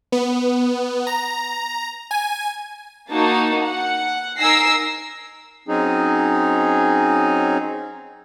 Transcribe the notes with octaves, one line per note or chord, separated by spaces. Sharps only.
B3
A#5
G#5
A#3 D#4 F#4 A5
F#5
D#4 A#4 G#5 E6 A#6 C7
F#3 C4 C#4 D#4 G#4